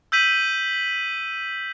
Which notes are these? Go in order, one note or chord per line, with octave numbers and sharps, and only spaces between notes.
E6 G6 B6 D#7 F#7